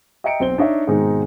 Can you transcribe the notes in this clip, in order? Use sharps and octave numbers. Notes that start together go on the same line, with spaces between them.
D#5 E5 G5 A#5 C#7 D7
B1 C4 G7
D4 D#4 C#5 E5
G#2 B2 D#3 G#3 C4 D#4